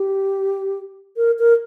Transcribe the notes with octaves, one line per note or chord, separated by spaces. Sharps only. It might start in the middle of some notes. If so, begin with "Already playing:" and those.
Already playing: G4
A#4
A#4